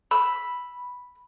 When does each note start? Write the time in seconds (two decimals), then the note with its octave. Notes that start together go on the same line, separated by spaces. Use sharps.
0.11 B5 E6